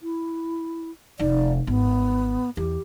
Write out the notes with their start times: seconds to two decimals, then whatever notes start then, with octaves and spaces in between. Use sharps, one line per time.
0.02 E4
1.19 F1 D#4 D5
1.67 G#1 B3
2.57 E2 G4